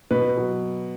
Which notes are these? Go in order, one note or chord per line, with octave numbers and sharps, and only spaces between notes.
B2 B4
F#3